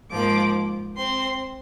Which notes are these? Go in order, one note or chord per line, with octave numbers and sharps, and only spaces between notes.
G#2 F3 A#3 D6
C4 C6